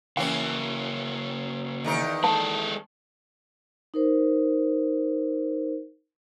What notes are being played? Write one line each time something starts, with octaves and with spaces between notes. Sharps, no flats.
C#3 E3 A#3 C#4 G5
E2 D#3 A#4
G#3 A4 A5
D#4 A#4 C5